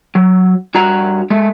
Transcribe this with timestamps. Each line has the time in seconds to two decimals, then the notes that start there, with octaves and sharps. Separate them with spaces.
0.15 F#3
0.75 G2 F#4 F#5 A#5
1.30 G#3 A3